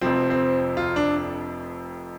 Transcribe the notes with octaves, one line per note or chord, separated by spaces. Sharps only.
F1 F2 C3 F3 C4
C4
F4
D4